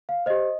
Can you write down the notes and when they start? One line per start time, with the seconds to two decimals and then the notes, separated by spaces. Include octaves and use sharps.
0.09 F5
0.26 G4 C5 D#5